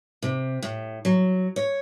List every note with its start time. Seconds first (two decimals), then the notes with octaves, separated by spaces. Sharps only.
0.22 C3
0.62 A2
1.05 F#3
1.56 C#5